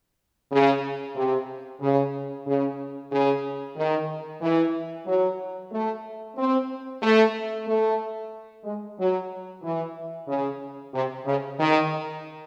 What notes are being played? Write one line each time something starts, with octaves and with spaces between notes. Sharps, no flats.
C#3
C3
C#3
C#3
C#3
D#3
E3
F#3
A3
C4
A3
A3
G#3
F#3
E3
C#3
C3
C#3
D#3